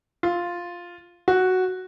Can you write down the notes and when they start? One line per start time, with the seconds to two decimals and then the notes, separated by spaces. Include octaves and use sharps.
0.23 F4
1.28 F#4